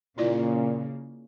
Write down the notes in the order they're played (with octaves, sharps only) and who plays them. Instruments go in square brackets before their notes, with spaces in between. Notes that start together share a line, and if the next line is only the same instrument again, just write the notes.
[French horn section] A#2 [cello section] C#3 A#3 [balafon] E4 F4 D5